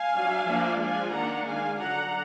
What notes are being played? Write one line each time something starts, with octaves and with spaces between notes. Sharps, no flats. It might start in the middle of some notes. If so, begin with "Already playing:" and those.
Already playing: F5 G#5
F#3 D4
F3 A#3 D4
F3 G#3 D4 F5 G#5
D#3 A#3 D4 F#5 A#5
D#3 G#3 D4 F5 G#5
D3 F#3 D4 F#5 A#5